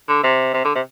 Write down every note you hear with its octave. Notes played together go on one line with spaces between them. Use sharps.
D3
C3
C3
D3
C3